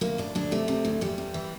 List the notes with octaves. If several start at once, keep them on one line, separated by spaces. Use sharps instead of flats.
D2 A#3
D2 D4
D2 D4
C3 A3
C3
D2
E2 G3
E2
E3